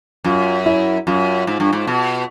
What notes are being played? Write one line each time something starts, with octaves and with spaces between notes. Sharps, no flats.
F#2 F4
E4
F#2 F4
G#2
G2
G#2
B2